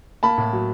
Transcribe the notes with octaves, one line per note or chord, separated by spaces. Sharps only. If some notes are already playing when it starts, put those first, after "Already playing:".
A#3 A5 B5
A2
F#3